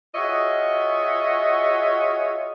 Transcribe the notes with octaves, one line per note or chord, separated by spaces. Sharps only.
F4 F#4 G#4 C#5 D#5 E5